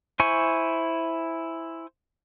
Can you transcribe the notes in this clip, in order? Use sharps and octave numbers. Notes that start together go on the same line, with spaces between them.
E4 C5 G#5 C#6